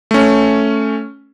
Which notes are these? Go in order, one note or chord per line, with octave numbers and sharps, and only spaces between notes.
A3 C#4